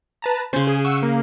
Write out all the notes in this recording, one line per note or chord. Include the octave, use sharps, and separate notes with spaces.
B4 A5 A#5
C#3 C#4 C5
G#4
F#5 C#6 E6
A#3